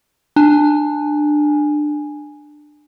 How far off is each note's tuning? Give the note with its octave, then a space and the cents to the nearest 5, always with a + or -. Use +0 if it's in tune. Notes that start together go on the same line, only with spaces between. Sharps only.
D4 +20 G#5 +0